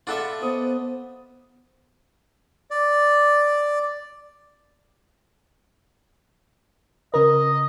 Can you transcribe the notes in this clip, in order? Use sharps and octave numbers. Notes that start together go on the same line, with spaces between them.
F4 A4 D5 E5 F#5 B5
B3 C5 D#5
D5
C#3 A#4 D#5